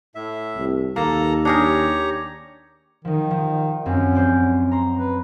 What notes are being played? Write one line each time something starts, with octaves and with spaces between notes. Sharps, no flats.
A2 E5
C2
D#2 A#3 A4 A5 A#5
D4 G4 G#4 A#4 C#5 A#5
D#3 F3 D#4
F3
F#2 C4 C#4
F#3 C5 D5
A#5 C6
B4